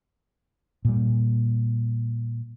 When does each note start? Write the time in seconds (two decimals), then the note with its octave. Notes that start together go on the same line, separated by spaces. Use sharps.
0.85 A#2 G3